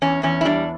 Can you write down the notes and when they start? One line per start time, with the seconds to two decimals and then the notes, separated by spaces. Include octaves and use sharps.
0.02 E2 C#4
0.23 E2 C#4
0.41 E4
0.45 G3 D4